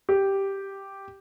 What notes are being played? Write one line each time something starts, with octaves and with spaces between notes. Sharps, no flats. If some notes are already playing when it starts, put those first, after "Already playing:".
G4